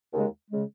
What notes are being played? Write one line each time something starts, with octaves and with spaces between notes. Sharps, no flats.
D#2 C#3 G#3
C#3 G#3